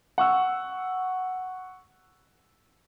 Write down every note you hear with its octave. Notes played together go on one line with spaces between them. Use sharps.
F#5 C#6 E6